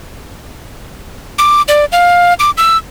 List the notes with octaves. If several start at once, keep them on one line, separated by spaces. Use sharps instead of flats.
D6
D5
F5
D6
E6